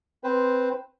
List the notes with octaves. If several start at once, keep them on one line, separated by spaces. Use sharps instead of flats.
C4 B4 C5